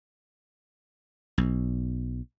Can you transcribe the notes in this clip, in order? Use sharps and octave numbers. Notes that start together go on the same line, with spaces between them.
B1